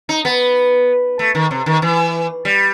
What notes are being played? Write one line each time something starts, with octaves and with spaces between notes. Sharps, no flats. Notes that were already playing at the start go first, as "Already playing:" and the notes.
D#4
B3
A3
D#3
C3
D#3
E3
G3